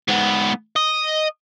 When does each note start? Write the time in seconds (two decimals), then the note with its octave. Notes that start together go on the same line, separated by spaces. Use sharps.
0.08 G#2 B3
0.76 D#5